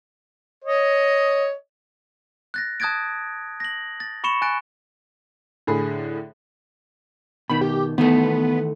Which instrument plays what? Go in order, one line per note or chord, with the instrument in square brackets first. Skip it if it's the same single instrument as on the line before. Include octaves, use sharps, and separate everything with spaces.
[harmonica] C#5 D#5
[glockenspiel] F#6 A6 A#6
A5 D#6 F#6 G#6 A6 D7
A#6 F#7
A6
B5 C#6 C#7 E7 G7
G#5 F#6 A6 D7
[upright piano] A2 D3 G#4 B5
[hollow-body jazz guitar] B2 D#3 [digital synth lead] B5
[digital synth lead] G4
[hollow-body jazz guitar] D#3 E3 A3 [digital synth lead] B3